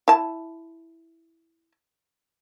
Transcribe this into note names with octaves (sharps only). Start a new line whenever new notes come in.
E4 A5